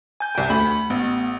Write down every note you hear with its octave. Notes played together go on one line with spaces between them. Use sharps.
G#5 G6
C2 G5
D2 B5
A1 B3